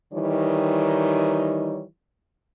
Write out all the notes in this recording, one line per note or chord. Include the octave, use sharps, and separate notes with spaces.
D#3 E3 G3 D#4 C#5